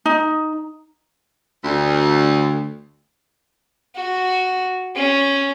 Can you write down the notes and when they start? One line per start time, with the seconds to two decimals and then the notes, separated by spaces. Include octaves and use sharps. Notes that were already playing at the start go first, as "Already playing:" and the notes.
0.05 D#4
1.63 D2
3.95 F#4
4.95 C#4